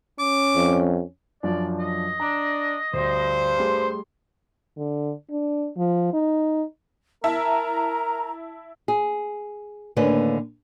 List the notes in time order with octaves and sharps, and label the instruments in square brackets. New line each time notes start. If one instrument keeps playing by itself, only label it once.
[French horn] C#4 [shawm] D6
[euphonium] F2
[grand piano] F#2 F3 D4 [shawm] D5
[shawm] D#5
[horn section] D4 [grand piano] A#5
[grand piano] D2 [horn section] G2 C5
[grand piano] G3 A3 G#4 [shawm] C6
[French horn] D3
D4
F3
D#4
[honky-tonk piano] E4 E5 A5 [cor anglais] A#4 [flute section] A#5
[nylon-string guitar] G#4
D#2 A2 D3 A#3 C#4 B4